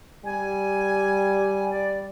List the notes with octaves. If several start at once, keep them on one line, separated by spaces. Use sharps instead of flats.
G3 G#5
D5